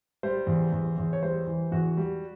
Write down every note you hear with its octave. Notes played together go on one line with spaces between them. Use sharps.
G3 C5
E2
E2
E2
C#5
G3 C5
E3
E2 F#4
G3